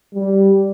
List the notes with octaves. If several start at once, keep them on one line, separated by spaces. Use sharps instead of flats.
G3